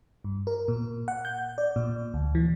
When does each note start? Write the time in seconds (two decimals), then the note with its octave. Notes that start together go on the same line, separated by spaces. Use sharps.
0.24 G2
0.47 A#4
0.68 A#2
1.08 F#5
1.25 G6
1.58 D5
1.76 A#2
2.14 D2
2.35 E3